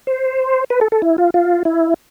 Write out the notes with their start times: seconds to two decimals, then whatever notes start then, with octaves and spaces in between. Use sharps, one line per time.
0.07 C5
0.70 B4
0.81 A4
0.92 A4
1.02 E4
1.18 F4
1.34 F4
1.65 E4